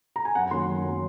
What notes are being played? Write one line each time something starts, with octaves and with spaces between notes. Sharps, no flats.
A#5
G#5
F#2 F#5
D#3 F#3 A#3 C#4 C6
F#2
D#3 F#3 A#3 C#4